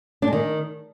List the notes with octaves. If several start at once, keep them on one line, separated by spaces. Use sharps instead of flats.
D4
G#3
D#3